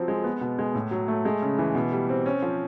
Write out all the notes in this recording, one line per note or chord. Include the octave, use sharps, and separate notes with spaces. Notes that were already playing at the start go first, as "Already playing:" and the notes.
Already playing: F3 F#3 C4
G#3
B3
B2
G#3
A2
F#3
A3
G#3
C#3
E3
B2
G3
C4
C#4
F3